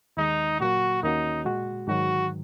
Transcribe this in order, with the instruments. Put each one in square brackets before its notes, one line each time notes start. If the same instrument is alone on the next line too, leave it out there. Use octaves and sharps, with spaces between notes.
[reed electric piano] D#2 D#3 G#3 [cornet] D#4
[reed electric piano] A#2 F#3 A#3 [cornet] F#4
[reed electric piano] D#2 D#3 A#3 C#4 F#4 [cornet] D#4
[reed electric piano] A#2 G#3 F#4
[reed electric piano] G#2 D#3 F#3 [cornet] F#4